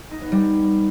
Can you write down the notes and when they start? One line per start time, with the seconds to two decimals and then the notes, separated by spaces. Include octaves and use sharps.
0.11 D#4
0.21 B3
0.32 G3